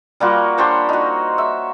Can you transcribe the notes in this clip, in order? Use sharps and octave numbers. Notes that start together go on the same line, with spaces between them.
G3 A#3 F4 F#4
D4 G4 C5 C#5
D#4 F#4
E5